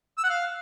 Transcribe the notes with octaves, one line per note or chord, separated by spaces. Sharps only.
E6
F#5
F5